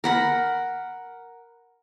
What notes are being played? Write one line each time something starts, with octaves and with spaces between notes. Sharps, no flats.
A#4 F#5 B5